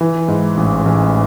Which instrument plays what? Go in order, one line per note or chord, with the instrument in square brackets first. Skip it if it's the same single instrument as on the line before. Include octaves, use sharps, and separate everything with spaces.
[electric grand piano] E3
G#2
A1
A1